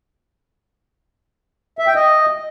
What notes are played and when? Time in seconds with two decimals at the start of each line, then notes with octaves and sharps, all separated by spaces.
1.79 E5
1.87 G5
1.95 D#5